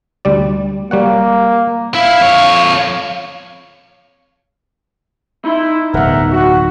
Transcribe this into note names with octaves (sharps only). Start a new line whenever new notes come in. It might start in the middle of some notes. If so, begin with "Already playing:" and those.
D2 G3 D5
G3 A#3 C#5 F#5
E4 E5 F5
F2 C#5
D#4 E4 C6
D1 B1 A#4 E5 F#5
F#4